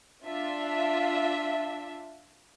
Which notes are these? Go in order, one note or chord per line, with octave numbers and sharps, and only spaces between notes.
D4 F4 E5